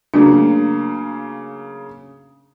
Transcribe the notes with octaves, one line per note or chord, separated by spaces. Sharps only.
C#3 F#3 A3 A#3 D4